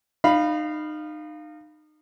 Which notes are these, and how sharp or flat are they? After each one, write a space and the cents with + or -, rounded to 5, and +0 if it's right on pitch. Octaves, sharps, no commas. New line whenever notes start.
D#4 -30 F5 +0 B5 -5